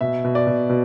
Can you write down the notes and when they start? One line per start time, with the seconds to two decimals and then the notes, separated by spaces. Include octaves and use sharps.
0.01 B2 E5
0.24 B2
0.35 D5
0.47 B2
0.70 B2